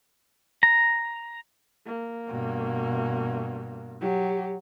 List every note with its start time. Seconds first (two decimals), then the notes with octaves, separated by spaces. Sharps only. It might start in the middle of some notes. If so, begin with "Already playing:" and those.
0.63 A#5
1.87 A#3
2.27 G2 B2
4.01 F#3 G4